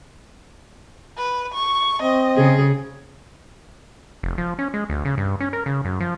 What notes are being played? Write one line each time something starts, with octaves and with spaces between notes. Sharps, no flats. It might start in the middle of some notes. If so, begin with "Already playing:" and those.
B4
C#6
C4 D#5
C#3 G#4
F1
F3
C#4
G#3
D2
C#3
G2
C#4
A#4
C#3
F#2
F3